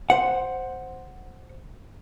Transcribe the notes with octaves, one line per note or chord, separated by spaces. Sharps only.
C5 F#5